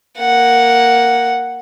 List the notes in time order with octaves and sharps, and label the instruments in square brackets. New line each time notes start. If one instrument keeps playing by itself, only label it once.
[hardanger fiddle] A#3 F#5